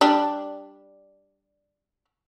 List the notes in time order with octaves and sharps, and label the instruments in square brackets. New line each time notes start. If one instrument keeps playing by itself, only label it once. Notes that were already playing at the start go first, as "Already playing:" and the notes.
[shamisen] G3 D4